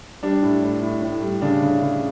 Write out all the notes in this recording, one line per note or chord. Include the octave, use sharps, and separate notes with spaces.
G3 D4
A2
A2
A2
A2
G3
C#3 D4
C#3
C#3